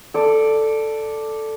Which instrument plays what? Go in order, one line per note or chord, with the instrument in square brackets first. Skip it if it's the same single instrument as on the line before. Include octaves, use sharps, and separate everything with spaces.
[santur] A4 D5